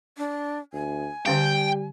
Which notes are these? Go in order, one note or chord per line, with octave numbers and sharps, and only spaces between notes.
D4
D2 G#5
D3 G3 C#4 F5 G5